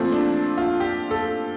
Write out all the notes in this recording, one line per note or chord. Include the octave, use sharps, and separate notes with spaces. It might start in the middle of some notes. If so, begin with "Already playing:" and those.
Already playing: A#2 F3 A3 C4
D4
F4
G4
A4